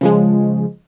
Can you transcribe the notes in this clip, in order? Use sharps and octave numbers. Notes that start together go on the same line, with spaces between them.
C#3 F3 G#3